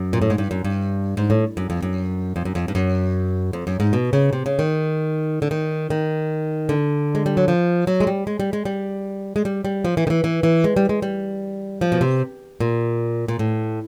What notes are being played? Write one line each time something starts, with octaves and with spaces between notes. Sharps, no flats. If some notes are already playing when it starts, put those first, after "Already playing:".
Already playing: F#2
A#2
A2
G#2
G2
F#2
G2
G#2
A2
F#2
F2
F#2
F2
F#2
F2
G2
F#2
F2
F#2
G#2
B2
C#3
C3
C#3
D#3
D3
D#3
D#3
D3
G#3
G3
F#3
F3
F#3
G#3
G3
G#3
G3
G#3
G3
G#3
G3
G3
F3
E3
D#3
E3
E3
E3
G#3
G3
G#3
G3
F3
B2
C3
A#2
A#2
A2